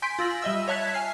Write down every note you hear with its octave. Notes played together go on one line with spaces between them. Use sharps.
G#5 C6 G6 B6 D7
F4 E6 A#6 F#7
G3 D#5 E5 E6
C#5 E5 A5 F#6 G#6 B6
G#5 F6 C7